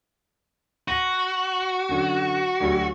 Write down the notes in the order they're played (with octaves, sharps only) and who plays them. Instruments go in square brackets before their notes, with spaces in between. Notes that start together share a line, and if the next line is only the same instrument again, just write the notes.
[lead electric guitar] F#4 [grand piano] A#6 D#7
[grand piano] F#2 D3 F#3
D2 F#3 G3